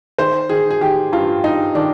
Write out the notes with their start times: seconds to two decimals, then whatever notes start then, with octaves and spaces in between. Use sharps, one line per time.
0.19 D#3 C5
0.49 D#3 G#4
0.71 G#4
0.81 D#3 G4
1.12 G2 F4
1.44 G2 D#4
1.75 D#3 D4